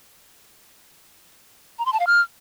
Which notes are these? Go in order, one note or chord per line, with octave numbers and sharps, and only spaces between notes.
A#5
C6
A5
F5
F6